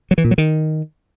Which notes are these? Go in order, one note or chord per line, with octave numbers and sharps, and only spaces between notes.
F#3
E3
A#2
F#3
D#3